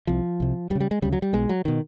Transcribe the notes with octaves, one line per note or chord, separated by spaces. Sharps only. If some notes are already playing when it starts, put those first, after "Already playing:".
C2 C3 F3
C2 C3
D2 G3
C#3
G3
G#3
D2 C#3 G3
F#3
G3
B1 B2 G#3
F#3
B2 D#3